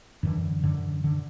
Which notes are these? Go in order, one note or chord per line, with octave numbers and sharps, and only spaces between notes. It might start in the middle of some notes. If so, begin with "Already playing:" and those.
F#2 D3 E3
F#2 D3
D3